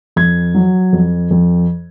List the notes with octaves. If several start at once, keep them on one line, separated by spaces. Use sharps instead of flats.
F2 G#6
F#3
F2
F2